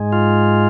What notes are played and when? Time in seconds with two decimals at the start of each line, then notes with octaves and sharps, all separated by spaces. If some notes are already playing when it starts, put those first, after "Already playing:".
Already playing: G#2 G#3
0.12 F4